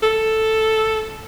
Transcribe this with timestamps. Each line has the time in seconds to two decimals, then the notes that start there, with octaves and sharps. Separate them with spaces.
0.03 A4